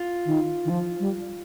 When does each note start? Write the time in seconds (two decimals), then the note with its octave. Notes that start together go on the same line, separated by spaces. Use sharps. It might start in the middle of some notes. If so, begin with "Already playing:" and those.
Already playing: F4
0.25 D#3
0.65 D#3
0.70 F3
1.00 G3